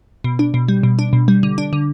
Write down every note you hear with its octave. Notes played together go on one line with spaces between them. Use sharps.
B2
D4
B2
G3
B2
D4
B2
G3
D3
D4
D3